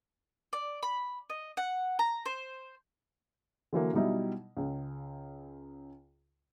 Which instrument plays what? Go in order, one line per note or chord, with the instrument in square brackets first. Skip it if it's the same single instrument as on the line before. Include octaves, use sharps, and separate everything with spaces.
[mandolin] D5
B5
D#5
F#5
A#5
C5
[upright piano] D3 E3 F#3 A#3
B2 F#3 G3 D#4 E4
C#2 C#3